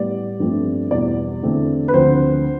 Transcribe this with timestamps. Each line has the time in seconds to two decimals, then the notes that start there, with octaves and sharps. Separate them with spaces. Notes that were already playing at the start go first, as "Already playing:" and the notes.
Already playing: A2 G3 B3 D5
0.40 G2 F3 A3 C4
0.91 E2 B2 G3 D5
1.43 E2 D3 A3 C4
1.88 B4
1.93 D2 D3 F3 C4 C5